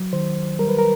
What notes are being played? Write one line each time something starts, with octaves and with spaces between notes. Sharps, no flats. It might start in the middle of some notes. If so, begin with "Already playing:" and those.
Already playing: F#3
D#3 C5
G3 A#4
B4
A#4